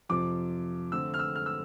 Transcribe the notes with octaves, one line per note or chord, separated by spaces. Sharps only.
F2 C3 F3 D6
D3 A3 C4 E6
F6
E6
F6
E6